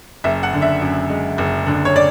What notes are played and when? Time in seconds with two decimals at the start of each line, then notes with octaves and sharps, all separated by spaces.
0.24 F#1 E5
0.43 F#5
0.53 D3
0.62 E5
0.81 F#2
1.10 G#3
1.38 F#1
1.67 D3
1.85 C#5
1.96 D5